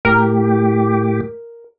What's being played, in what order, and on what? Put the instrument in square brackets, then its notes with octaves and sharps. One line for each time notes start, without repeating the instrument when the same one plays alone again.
[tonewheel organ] A2 G4 [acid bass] A#4